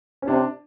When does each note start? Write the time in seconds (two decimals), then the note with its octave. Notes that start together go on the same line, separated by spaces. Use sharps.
0.22 C#4
0.28 C3 D4